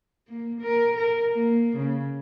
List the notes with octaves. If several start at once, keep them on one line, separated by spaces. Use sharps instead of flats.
A#3
A#4
A#4
A#3
C#3